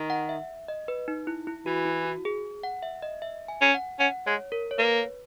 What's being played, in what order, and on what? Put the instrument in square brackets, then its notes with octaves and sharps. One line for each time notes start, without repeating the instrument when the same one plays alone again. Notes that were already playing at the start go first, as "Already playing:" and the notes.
Already playing: [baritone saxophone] D#3
[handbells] F#5
E5
D#5
B4
D#4
E4
E4
[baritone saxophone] E3 [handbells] F#4
[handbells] E4
F#4
G#4
F#5
E5
D#5
E5
G#5
[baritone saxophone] C#4
[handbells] F#5
[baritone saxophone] C#4 [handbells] F#5
[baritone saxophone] G#3 [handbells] C#5
[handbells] A#4
C#5
[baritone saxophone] A#3 [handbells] B4